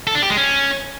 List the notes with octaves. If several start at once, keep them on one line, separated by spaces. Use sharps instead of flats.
A4
D4
G4
G#3
C#4